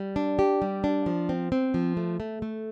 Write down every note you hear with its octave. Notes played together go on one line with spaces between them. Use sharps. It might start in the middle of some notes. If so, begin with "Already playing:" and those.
Already playing: G3
D4
G4
G3
D4
F3
C4
C4
F3
A3
A3
A3